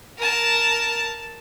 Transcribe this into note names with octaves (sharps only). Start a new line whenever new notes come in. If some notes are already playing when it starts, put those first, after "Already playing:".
A#4 A5